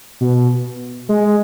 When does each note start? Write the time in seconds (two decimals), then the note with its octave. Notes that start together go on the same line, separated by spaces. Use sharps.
0.21 B2
1.09 G#3